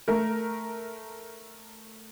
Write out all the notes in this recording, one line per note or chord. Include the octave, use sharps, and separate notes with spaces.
A3 A#4